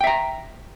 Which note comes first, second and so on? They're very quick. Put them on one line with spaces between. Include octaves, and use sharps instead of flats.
G5 E5 A#5